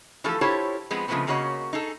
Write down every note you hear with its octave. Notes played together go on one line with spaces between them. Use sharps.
E3 F3 A3 G4 A4
E4 F4 G4 A4 C5 C#5
F3 G#3 B3 C4
C#3 F3 G#3 A3 B3 C4
C#3 A#3 C#4 F#4 C#5 D#5
D#4 G#4 A4